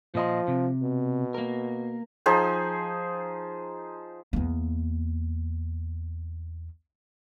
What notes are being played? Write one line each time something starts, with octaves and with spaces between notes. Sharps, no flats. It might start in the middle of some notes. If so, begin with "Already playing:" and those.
A#2 F3 D#5 C6
C3
B2
A#3 A#4
F3 D#4 G#4 C5
E2 A#3